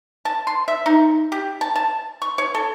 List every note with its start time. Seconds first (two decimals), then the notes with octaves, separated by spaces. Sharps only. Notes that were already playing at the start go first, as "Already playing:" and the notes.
0.25 A5
0.47 C6
0.68 E5
0.86 D#4
1.32 G4
1.61 A5
1.76 A5
2.22 C#6
2.38 C#5
2.55 A4